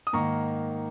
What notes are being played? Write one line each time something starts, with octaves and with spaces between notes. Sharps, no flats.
D#6
G#2 D#3 A#3 A#5 C#6